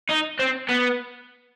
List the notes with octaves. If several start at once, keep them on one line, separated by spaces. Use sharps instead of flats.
D#4
C4
B3